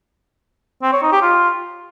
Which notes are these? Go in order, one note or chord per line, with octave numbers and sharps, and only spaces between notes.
C4
C#5
D#4
G4
F4